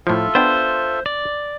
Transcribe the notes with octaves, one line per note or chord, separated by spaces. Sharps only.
A2 F3 F4 A4 E5
B3 D4 C5 G5
D5